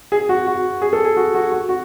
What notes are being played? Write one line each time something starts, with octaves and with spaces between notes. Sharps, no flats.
G#4
F#4
F#4
G#4
A4
G#4
F#4
F#4
F#4
F#4